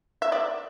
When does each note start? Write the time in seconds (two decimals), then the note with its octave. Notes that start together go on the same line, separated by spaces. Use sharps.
0.22 E5
0.32 D5